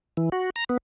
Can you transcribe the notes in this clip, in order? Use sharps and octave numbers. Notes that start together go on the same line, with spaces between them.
E3
F#4
A#5
B3